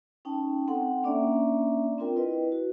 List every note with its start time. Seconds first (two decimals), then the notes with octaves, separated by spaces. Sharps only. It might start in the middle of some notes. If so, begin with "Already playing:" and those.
0.25 C#4 D#4 G5 A5
0.68 C4 A4 F#5 G5
1.03 A#3 C#4 D4 D5 E5 A#5
1.98 C4 D4 F4 A#4 G5
2.16 E4 B4 D#5
2.52 F#4